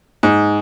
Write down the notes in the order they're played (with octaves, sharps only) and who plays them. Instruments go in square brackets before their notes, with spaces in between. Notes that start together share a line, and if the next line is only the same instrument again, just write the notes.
[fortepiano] G#2